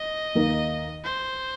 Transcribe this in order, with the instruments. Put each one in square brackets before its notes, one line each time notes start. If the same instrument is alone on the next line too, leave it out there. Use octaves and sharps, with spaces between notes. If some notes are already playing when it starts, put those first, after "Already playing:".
Already playing: [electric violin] D#5
[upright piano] D#2 D#3 A#3 D#4
[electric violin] C5